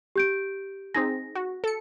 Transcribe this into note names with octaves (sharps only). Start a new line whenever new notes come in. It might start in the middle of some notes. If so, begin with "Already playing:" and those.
G4 G6 D7
C4 D#4 G#4 A#6
F#4
A4 C#7